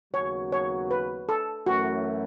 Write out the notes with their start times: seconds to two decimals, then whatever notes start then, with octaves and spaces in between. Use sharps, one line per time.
0.14 D#2 C#3 F#3 B3 F#4 C#5
0.52 C#5
0.91 B4
1.29 A4
1.66 F#2 E3 A3 C#4 E4 F#4